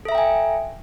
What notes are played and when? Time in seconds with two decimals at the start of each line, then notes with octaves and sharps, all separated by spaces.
0.05 A4
0.09 E5
0.12 A#5
0.15 G5
0.18 G#5